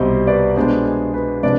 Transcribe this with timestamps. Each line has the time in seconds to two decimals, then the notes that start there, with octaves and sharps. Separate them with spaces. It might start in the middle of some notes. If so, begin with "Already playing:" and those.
Already playing: C2 B2 G3 C4 C5 D#5
0.27 B4 D5
0.56 B2 G#3 B3 D4 G#4 C5
0.86 G#4
1.14 B4
1.43 C3 F3 G#3 D4 B4 D5